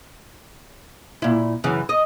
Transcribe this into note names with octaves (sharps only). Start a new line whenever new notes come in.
A#2 E4
F#2 C#3 E3
D#5